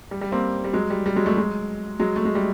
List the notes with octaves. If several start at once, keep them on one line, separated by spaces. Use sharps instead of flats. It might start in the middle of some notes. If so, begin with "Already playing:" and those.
G3
G3
A#3 C4
G3
F#3 G#3
G3
G3
F#3 G#3
G3 A3
F#3 G#3
F#3 G#3
A3
G#3
G3